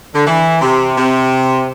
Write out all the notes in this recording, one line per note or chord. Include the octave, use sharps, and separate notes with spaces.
D3
E3
C3
C3